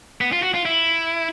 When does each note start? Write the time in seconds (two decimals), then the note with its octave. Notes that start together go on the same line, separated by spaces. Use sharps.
0.21 B3
0.32 F4
0.43 F#4
0.54 F4
0.65 E4